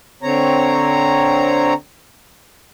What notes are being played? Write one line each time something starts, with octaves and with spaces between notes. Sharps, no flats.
D3 C4 C#5 A#5